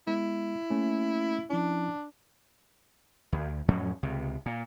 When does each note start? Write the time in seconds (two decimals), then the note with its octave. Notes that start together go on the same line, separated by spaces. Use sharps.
0.07 G#3 B3 E4
0.70 A3 A#3 C#4
1.50 F3 C#4 D4 E4
3.32 D2
3.68 F2 A2 F#3 C#4
4.03 C#2 C3
4.46 A#2